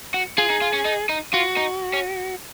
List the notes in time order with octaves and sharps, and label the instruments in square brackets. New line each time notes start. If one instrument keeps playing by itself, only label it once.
[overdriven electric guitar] F#4
[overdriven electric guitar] F4 [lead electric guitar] G#4
[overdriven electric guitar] D#4
F4
C#4
D#4
D#4
[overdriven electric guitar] F4 [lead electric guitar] F#4
[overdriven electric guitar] D#4
C#4